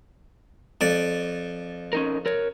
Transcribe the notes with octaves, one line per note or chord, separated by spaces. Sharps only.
F2 D5
C#4 D#4 A#4
A#4 C#5